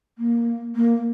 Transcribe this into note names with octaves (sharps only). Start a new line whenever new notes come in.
A#3
A#3